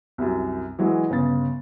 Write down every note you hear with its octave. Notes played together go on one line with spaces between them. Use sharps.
C2 F#2
E3 F#3 G#3
G1 C#3 A6